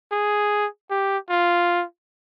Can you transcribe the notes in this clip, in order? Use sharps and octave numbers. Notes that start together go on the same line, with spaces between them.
G#4
G4
F4